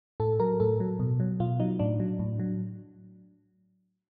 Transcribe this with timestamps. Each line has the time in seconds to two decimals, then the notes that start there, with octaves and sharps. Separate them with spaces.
0.20 A2 A4
0.40 F#3 A#4
0.60 A2 A4
0.80 F#3
0.99 B2
1.20 F#3
1.40 B2 F4
1.60 F#3 D#4
1.79 A2 D4
2.00 F#3
2.19 A2
2.39 F#3